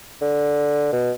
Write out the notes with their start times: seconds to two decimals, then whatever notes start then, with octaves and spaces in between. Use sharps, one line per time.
0.22 D3
0.93 B2